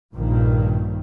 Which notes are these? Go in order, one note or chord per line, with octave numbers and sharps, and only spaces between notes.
A#1 G2 A#2 D#3